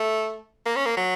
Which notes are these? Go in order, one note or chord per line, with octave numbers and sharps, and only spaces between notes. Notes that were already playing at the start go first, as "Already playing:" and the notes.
Already playing: A3
A#3
C#4
A#3
F#3